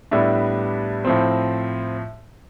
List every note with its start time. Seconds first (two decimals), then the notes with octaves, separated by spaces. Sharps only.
0.11 A2 G3 B3 D4 E5
1.05 A2 F3 C4